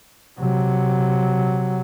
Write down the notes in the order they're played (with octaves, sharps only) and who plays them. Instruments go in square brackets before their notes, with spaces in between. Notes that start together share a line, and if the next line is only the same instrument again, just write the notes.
[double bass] C3 F#3